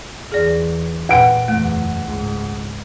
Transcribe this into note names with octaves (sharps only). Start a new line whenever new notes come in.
E2 G#4 D5
A#2 B4 F#5 G5 B5 D7
F#1 E2 A3
C#2 G#2